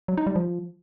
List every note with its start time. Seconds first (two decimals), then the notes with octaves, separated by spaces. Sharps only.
0.08 F#3
0.17 D#4
0.27 G3
0.36 F3